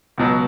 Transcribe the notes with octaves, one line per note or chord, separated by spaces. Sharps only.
C#2 B2 F#3